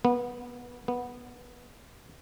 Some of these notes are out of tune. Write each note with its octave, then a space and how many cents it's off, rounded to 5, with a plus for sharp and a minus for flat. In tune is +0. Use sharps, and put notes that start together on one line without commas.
B3 -20
B3 -10